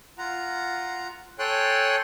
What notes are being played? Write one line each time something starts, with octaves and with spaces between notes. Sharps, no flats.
F4 F#5 A#5
A4 C#5 G5 G#5 C6 F#6